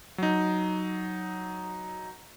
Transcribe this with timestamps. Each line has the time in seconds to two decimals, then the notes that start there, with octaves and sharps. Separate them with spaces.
0.18 F#3 D#4